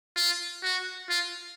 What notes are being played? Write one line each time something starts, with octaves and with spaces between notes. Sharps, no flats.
F4
F#4
F4